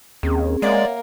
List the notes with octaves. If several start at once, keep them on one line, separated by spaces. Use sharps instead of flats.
D#2 C4 C#4 G#4
G#3 A#3 C#5 D5 E5 F#5